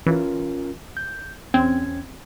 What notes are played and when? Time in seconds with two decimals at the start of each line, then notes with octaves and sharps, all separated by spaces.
0.07 E3 C#4 F4 A#4
0.97 G6
1.54 E2 C4 C#4 G#6